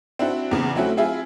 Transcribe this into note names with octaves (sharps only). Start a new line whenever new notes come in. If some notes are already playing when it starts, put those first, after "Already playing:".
C4 D4 E4 F#4
E2 C#3
F#3 A3 C4 C#4 E4 F#4
C4 E4 F4 G#4 E5